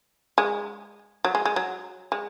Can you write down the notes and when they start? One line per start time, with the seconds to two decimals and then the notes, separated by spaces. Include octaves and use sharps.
0.38 G#3
1.25 F#3
1.35 G#3
1.46 G#3
1.56 F#3
2.12 G#3